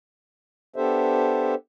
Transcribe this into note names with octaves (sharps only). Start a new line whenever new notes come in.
B3 D4 G4 A4 C5 E5